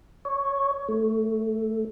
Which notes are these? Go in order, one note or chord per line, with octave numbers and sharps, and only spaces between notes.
C#5
A3